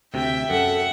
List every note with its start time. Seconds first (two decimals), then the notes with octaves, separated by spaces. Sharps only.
0.14 D2 C3 E5 G5
0.50 F#2 A4 F#5